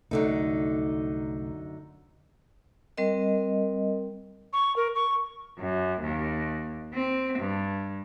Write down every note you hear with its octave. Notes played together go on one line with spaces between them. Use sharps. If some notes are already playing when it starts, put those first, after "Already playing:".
C2 F#2 D3 A3 D#4
G3 C4 A#4 D#5
C#6
A#4
C#6
F#2
D#2
C4
G2